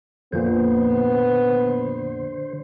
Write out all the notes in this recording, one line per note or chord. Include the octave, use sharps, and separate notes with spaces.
F2 A#2 D3 B3 C5